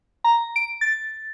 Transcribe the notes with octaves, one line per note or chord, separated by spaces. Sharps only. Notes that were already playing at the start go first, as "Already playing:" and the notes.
A#5
D7
A6